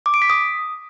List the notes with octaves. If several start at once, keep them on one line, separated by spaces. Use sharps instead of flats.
D6
D7
B6
D#6